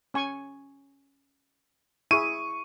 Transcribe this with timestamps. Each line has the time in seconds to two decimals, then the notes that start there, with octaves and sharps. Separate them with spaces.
0.14 C#4 G#5 C#6
2.11 E4 G#4 C#6 D#7